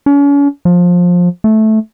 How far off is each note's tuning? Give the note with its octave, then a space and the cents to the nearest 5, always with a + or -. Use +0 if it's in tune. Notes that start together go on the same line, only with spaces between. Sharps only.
C#4 +40
F3 +20
A3 -10